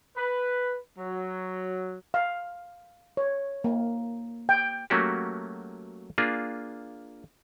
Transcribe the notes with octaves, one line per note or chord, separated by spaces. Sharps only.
B4
F#3
F5
C#5
A#3
G5
F#3 A3 A#3 C#4 F#4 G4
A#3 D4 F4 G#4